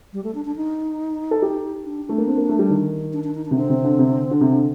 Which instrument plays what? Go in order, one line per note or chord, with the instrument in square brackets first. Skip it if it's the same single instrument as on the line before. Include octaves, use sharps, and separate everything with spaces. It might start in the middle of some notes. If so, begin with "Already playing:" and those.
[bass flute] G3
A3
D4
D4
D#4
[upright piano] A4
G4
[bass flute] D4
[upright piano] A3 [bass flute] D4
[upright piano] A#3
C4
A#3
A3
G3
D#3
[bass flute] D4
D4
D#4
D4
[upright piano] C3
[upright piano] D3 [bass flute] C4
[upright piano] C3
D3
C3
D3
D3
[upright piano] C3 [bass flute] C4
[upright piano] D3